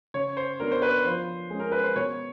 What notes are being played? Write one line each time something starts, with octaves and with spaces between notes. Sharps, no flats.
C#3 C#5
C5
F#3 B3 D4 A#4
C5
B4
F3 C5
G#3 C#4
A#4
B4
C5
B2 C#5